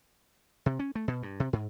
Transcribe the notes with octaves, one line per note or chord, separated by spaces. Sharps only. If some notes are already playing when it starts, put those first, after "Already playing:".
C3
C#4
A3
B2
G2
C3
G#2